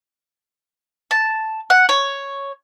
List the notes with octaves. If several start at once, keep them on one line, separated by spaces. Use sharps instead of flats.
A5
F#5
C#5